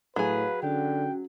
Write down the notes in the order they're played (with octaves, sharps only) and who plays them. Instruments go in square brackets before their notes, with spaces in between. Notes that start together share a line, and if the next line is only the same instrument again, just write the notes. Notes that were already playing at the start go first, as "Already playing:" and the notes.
[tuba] A2 [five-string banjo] F#3 G#4 [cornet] B4 [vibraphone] F5
[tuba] D3 [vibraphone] C#4 F#4 [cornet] G5